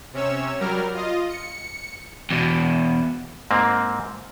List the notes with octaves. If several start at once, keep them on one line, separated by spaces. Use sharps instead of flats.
C3 C#4 C#5 E6
F#3 G3 A#4 F6
F4 D#5
C#7
E2 B2
G#2 A#3 C4